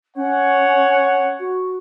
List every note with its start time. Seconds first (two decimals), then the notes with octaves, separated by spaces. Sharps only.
0.16 C#4 C#5 F#5
1.40 F#4